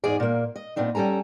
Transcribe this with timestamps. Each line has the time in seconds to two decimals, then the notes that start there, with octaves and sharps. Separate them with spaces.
0.04 E2 G#2 G#4 D5
0.20 A#2 A#3
0.56 D#5
0.76 A#2 B3 C4 D4 D#4
0.95 G3 C#4 A4 G#5 A#5